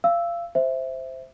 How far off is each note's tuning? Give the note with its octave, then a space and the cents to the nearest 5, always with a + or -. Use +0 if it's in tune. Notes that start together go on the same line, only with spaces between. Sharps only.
F5 -30 E6 +0
C5 -5 E5 +0